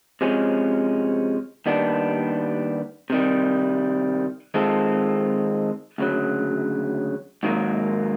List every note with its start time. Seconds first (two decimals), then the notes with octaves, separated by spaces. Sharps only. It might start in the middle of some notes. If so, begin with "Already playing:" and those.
0.21 C3 F3 G#3 C#4
1.66 D#2 D#3 G3 B3 D4
3.10 C3 D#3 G3
4.54 D#3 G#3 C4 F4 A4
5.98 D2 C#3 F#3
7.43 G#2 D#3 F#3 A#3